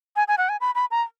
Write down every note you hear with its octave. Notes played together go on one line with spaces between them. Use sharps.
G#5
G#5
F#5
G#5
B5
B5
A#5